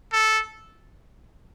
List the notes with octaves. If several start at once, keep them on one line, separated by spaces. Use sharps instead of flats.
A4